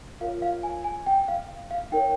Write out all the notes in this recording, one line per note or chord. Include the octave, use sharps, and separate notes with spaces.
F4 A#4 C#5 F5
F5
G#5
G#5
G5
F5
F5
D#4 A#4 C#5 G5